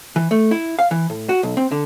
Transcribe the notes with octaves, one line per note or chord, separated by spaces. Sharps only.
E3
A3
E4
F5
E3
A2
F#4
B1
C4
D3